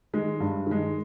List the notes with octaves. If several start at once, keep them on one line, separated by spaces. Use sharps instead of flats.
D#3 G#3
G2
D#3 G#3